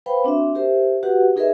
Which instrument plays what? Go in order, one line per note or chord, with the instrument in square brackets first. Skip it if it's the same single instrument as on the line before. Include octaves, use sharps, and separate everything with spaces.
[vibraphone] B4 C5 F5 G5 B5
C4 D4 F#4 E5
G4 A#4 C5 E5
F#4 G4 B4 F#5
D#4 G#4 A#4 B4 D#5 E5